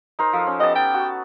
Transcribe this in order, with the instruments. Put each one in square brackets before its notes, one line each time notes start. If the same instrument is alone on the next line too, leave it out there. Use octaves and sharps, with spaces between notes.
[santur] D#4 A#4 C5
F3 A4
C#4
[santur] B3 G4 A5 [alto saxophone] D#5
[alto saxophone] G5
[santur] F#4